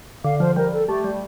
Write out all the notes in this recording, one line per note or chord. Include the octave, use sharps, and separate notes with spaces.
D3 F5
F3 C5
G3 A#4
A4
A3 G4
G3